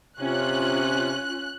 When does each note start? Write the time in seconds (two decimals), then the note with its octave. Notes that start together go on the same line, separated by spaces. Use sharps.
0.20 C3 C#4 F4 F#6